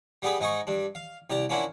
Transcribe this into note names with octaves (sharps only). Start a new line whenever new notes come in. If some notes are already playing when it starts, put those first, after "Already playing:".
G3 B3 G4 G#4 B4
G#2 G#3 D#4 D#5 G#5 C#6
G2 D4
F5
C2 G4 D5 A#5
A#3 C#4 D4 E4 F4 F#5